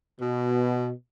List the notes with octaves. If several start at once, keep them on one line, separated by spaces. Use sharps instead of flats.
B2